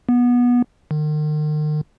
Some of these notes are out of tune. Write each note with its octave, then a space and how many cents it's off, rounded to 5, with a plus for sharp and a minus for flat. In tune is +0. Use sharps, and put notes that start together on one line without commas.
B3 -20
D#3 -40